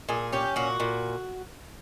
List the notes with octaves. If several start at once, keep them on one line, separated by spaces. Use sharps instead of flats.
A#2 G#4
C#4 G4
A#2 F#4
A#2